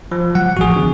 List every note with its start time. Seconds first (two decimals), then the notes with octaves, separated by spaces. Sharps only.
0.12 F3
0.35 F#3 F#5
0.57 A1 F3 F#4 G#4
0.76 D3 B3 D4